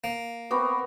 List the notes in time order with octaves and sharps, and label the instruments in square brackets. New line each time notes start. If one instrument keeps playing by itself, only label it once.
[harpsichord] A#3
[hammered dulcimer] B3 C4 A#4 [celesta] B5 C#6 D6